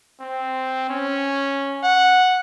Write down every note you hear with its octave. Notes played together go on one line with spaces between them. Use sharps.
C4
C#4
F#5